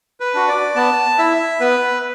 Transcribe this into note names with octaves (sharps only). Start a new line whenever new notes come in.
B4
D4 F#4
D5
B3 A5
E4 E5
B3 B4